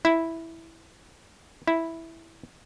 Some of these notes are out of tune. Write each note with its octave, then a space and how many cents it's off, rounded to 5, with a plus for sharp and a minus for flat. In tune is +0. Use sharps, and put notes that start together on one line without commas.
E4 -5
E4 -5